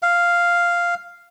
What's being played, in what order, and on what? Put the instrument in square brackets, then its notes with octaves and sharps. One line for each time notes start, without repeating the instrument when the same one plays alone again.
[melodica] F5